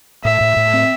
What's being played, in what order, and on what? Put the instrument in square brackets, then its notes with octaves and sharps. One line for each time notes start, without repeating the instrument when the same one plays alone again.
[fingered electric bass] A2 [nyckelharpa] E5
[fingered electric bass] A2
A2
C4